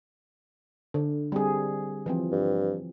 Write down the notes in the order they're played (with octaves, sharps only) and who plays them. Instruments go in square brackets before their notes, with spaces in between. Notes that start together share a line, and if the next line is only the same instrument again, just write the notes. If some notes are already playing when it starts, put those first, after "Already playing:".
[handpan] D3
G3 C4 G#4
E3 F3 C4
[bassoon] G2